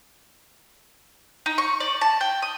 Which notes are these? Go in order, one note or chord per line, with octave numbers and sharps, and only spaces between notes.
D#4
C#6
D5
A5
G5
D#6